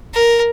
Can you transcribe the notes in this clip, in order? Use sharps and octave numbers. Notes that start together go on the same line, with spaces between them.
A#4